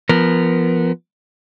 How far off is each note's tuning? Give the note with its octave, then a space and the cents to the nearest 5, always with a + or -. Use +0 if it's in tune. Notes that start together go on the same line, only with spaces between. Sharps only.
F3 -20 B3 +0 A#4 +0